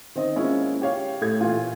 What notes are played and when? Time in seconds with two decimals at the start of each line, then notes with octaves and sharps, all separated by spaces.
0.15 D#3 C4 D#5
0.36 G#3 A#3 C#4 E4 F4
0.82 G4 C#5 F5
1.21 A2 A3 G4 G#6
1.41 A#2 E3 F4